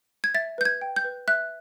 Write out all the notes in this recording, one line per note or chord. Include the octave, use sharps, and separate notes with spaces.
G#6
E5 A6
B4 G6
G#6
G5
G6
B4
E5 F#6